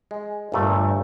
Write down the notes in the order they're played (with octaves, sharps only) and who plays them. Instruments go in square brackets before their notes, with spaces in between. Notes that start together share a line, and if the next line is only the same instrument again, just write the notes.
[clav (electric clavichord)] G#3
[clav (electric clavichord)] G1 A#2 A3 [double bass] G2